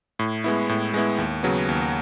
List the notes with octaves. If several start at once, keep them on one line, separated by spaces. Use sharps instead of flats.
A2
G#3 B3 E4
A2
G#3 B3 E4
D#2
C#3 F#3 B3
D#2